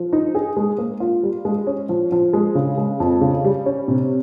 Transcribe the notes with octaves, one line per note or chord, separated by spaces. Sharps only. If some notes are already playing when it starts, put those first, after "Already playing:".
Already playing: F3
D#4
G#4
G#3
A#3
F4
G3
G#3
C#4
F3
F3
G#3
C#3
G#3
F2
C#3
G3
C#4
C3